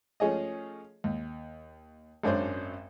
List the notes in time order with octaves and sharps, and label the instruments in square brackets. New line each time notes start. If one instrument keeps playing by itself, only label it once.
[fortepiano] F3 A3 C#4 G#4 D#5
D#2
G#1 F#2 C#4 D4 C5